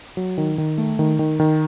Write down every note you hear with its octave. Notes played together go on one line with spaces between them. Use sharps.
F#3
D#3
D#3
A3
D#3
D#3
D#3